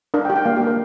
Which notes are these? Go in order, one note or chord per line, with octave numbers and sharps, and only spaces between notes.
D4 A#4
G5
G4
G5
A#3 F5
G4
A#3 A#4